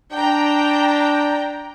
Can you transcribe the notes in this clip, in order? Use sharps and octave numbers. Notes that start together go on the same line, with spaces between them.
D4 G5 A#5